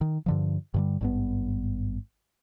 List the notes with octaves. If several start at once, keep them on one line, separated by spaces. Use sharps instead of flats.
D#3
G2 D3 F3
G2 D3 G3
G#1 G2 B3